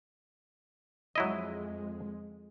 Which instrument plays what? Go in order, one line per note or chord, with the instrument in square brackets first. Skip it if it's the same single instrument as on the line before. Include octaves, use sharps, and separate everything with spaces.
[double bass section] F2 G#3 [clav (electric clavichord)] F#3 E4 D#5